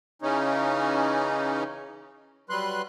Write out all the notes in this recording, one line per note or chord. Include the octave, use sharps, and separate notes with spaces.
C#3 E3 C#4 D#4
F#3 G3 B4 C6 F#6